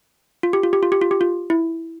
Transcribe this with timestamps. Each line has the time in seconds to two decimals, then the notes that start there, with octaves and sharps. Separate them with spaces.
0.43 F4
0.53 G4
0.63 F4
0.73 G4
0.83 F4
0.92 G4
1.01 F4
1.11 G4
1.21 F4
1.50 E4